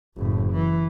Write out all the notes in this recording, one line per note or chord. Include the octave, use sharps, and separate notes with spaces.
F#1 A2
E3